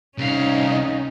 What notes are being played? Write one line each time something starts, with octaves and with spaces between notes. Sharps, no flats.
C2 C#4 D#4 F5